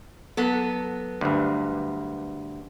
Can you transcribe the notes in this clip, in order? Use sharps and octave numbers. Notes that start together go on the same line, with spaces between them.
F#3 B3 A4
D2 G2